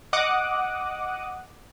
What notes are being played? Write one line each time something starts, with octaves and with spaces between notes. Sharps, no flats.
D#5 F#5 D6 D#6 F#6